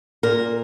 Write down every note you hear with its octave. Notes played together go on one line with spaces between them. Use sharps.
A#2 A#4